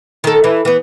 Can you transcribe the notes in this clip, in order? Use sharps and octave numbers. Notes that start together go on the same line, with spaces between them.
D#3 A4
E3
E3 B3